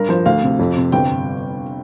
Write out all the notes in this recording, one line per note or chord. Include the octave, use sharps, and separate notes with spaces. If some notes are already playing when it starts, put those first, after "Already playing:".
Already playing: G2 A#4
F3 C5
D2 F5
C3
F2
C3
G1 G5